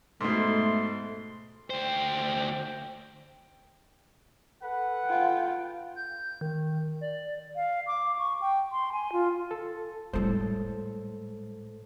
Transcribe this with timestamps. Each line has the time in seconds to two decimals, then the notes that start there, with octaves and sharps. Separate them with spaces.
0.21 G#2 B2 A3 C6
1.70 D2 C5 G5
4.62 A4 B4 F#5
5.07 F4 G5
5.96 G6
6.41 D#3
7.01 D5
7.56 F5
7.87 D6
8.18 C#6
8.41 G5
8.72 C6
8.92 G#5
9.12 F4
9.51 A4
10.13 A2 G3 G#3 A4 C5